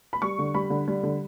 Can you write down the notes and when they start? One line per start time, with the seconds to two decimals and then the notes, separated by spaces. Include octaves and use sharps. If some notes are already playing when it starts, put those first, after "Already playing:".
0.13 B5
0.22 G3 C#6
0.39 D3
0.54 G3 B5
0.70 D3
0.88 G3
1.03 D3